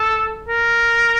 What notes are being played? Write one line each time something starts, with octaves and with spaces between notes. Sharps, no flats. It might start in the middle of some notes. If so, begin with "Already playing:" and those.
Already playing: A4
A#4